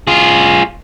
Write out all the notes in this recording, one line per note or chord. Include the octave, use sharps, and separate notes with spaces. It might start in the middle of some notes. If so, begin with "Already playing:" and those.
F4 G#4